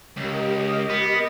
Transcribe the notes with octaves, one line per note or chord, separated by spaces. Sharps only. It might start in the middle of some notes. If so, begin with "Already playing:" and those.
C#2 G4 A#4 D#5
B3